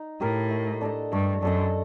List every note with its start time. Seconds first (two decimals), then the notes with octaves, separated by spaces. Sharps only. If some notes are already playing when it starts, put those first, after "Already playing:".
Already playing: D#4
0.21 A2 G4 A#4 D#5
0.51 A3
0.81 D4 A4 D#5
1.12 G2 A3
1.42 F#2 D4 A4 D#5